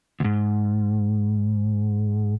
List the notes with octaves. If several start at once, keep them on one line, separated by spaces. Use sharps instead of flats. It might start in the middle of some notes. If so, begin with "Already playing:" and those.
D2 G#2